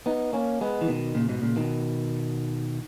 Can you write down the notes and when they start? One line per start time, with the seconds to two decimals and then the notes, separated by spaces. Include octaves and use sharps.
0.06 B3 D#4
0.33 A#3 C#4
0.61 G#3 B3
0.81 E3
0.88 B2 D#3
1.15 A#2 C#3
1.29 G#2 B2
1.42 A#2 C#3
1.56 B2 D#3